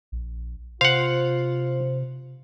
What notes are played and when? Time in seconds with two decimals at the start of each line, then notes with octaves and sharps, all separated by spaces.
0.12 A#1
0.81 C3 F4 C5 F5 F#5